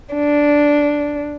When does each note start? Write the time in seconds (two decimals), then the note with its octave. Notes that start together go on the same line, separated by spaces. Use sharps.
0.13 D4